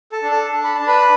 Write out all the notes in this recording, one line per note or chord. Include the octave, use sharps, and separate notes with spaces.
A4 A5
D4
A4 A5
D4
B5
A5
D4
B4 B5